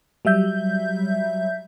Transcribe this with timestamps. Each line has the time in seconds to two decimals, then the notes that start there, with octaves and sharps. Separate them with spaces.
0.25 F#3 G3 E5 G6